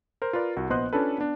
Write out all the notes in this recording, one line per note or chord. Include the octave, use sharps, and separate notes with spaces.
A#4 C5
F4 A#4 B4 D5
C2 F#4
A#1 B3 C5 D#5 C6 F#6
C#4 D4 F4 A4 B4
B3 D4